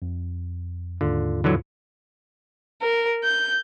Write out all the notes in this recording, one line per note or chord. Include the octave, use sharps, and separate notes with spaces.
F2
D#2 G#2 D3 F4
D3 E3 F#3
A#4
G6